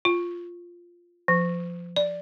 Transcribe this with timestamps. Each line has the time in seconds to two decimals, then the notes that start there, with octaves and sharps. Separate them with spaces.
0.05 F4
1.28 F3
1.96 D5